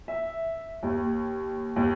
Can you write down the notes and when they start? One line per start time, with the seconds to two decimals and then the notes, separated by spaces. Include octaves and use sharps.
0.08 E5
0.83 D#2
1.76 D#2